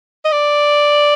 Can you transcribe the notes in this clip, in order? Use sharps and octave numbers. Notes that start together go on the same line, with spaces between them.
D#5
D5